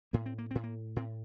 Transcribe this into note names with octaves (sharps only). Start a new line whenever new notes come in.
A2 A#3
C4
A#3
A2 C4
A#3
A2 C4